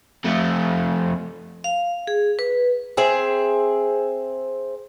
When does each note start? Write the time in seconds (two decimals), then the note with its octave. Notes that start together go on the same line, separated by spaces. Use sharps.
0.25 F2 A3
1.64 F5
2.07 G#4
2.39 B4
2.97 C4 G#4 E5